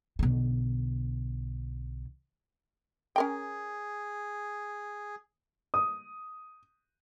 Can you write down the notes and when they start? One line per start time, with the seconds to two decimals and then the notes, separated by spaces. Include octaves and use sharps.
0.19 B1 D3
3.16 C#4 G#4 A#4 G5
5.74 D#6